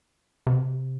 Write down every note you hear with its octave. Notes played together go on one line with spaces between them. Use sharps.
C3